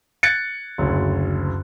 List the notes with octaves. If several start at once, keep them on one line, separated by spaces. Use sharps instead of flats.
F#6 G#6 A6 C#7
F#1 D2